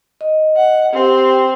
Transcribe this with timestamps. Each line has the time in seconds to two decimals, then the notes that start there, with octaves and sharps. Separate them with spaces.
0.21 D#5
0.56 F#5
0.93 C4 G4 G5